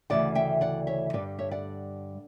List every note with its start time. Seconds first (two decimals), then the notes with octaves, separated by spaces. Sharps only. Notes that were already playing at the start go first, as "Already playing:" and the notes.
0.10 D2 C#3 E3 D5 F#5
0.35 E5 G5
0.61 D5 F#5
0.87 C#5 E5
1.13 G2 D3 G3 B4 D5
1.39 C#5 E5
1.51 D5 F#5